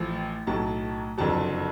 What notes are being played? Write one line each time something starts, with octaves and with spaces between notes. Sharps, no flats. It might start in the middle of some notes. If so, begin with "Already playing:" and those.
Already playing: A1 A2 F3
B1 A2 F#3 A5
F#1 F2 D3 F#3 A5